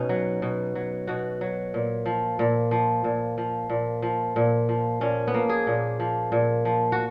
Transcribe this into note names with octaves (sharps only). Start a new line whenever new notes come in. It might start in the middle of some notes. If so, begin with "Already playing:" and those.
Already playing: B2 C#4 D#4
F#3
B2
F#3
B2 F#4
F#3
A#2
F3
A#2
F3
A#2
F3
A#2
F3
A#2
F3
A#2 C#4
B3
F3 A#3
G#4
A#2
F3
A#2
F3
F#4